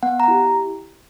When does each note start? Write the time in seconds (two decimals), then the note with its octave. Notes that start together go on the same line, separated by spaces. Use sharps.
0.03 B3 F#5
0.20 A#5
0.28 E4 G4